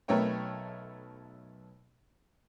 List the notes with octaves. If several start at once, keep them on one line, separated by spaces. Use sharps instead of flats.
B1 A3 B3 A#4 C#5 G5